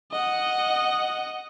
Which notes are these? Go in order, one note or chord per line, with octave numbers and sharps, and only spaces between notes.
D#5 F#5